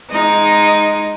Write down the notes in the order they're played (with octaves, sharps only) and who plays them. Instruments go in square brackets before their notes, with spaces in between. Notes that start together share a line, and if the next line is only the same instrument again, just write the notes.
[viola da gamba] G#3 D#4